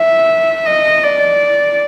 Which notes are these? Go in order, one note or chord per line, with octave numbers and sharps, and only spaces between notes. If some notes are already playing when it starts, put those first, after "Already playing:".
Already playing: E5
D#5
D5